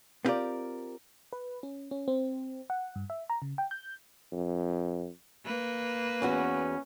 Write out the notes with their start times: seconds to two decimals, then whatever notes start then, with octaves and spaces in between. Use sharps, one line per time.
0.25 B3 C4 F4 G4 A#4 D5
1.33 B4
1.63 C#4
1.91 C#4
2.08 C4
2.70 F#5
2.96 G2
3.10 E5
3.30 A#5
3.42 C#3
3.58 G5
3.71 G6
4.33 F2
5.45 A#3 B4
6.22 E2 B3 C#4 F#4